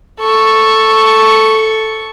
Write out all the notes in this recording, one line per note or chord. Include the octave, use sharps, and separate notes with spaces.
A4 C#6